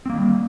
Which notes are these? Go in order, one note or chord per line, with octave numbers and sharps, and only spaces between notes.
D#3 G3 A#3 C4